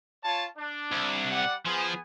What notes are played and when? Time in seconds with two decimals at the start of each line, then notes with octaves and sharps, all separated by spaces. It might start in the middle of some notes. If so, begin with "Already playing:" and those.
0.24 F4 C#5 A5
0.58 D4
0.92 C2
1.31 G3 D5 F#5
1.65 F3 B3 G#4 G#5